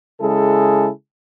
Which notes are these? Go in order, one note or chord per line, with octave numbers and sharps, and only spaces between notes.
C#3 G#3 E4 G#4 A4